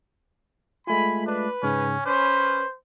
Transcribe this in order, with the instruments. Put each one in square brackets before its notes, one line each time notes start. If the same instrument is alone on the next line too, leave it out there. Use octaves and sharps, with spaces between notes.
[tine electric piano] G#3 A3 F4 [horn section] G#5 B5
[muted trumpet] D4 [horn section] B4
[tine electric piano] G#2 C#3 [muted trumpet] C#4
[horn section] C#4 B4 [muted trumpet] C5 [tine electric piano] D6